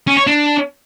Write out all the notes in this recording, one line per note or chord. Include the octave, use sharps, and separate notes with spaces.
C#4
C#5
D4